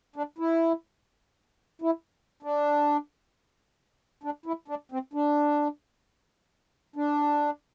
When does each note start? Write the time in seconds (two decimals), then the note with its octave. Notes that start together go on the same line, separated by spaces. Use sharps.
0.16 D4
0.38 E4
1.82 E4
2.43 D4
4.24 D4
4.46 E4
4.68 D4
4.92 C4
5.13 D4
6.96 D4